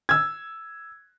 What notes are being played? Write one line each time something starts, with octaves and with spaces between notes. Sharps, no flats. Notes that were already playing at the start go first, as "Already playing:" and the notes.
E6 G#6